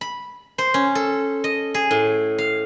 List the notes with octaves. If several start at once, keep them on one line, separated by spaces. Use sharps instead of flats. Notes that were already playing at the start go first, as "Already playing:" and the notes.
B5
C5
C#4
A4
D#5
G#4
A2
F5